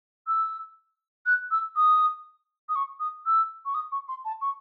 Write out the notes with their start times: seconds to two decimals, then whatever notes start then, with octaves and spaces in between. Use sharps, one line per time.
0.27 E6
1.26 F#6
1.51 E6
1.76 D#6
2.68 D#6
2.75 C#6
2.99 D#6
3.26 E6
3.65 C#6
3.74 D#6
3.91 C#6
4.08 C6
4.25 A5
4.41 C#6